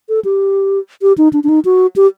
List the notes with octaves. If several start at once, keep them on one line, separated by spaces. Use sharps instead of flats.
A4
G4
G4
D#4
D4
D4
D#4
F#4
G4